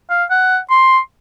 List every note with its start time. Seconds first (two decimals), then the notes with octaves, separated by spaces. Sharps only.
0.10 F5
0.31 F#5
0.71 C6